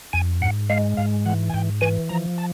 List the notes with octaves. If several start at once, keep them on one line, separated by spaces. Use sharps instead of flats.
F2 G#5
G#2 F#5
G#3 F5
G#2 F5
E3 F#5
G#5
G#2 G5
E3 G#5
F3 A#5
A5